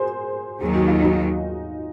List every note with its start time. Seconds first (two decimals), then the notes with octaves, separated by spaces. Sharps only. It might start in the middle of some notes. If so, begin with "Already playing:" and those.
Already playing: G#4 A#4 C5
0.61 D#2 D#3 F#3 G#4
0.75 F#4
0.88 F4
1.02 D#4 F#4